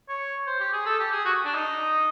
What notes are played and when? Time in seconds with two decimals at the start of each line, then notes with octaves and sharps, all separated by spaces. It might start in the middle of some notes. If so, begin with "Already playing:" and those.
0.09 C#5
0.47 C5
0.60 G4
0.73 G#4
0.86 A4
0.99 G4
1.12 G#4
1.25 F#4
1.45 D4
1.55 D#4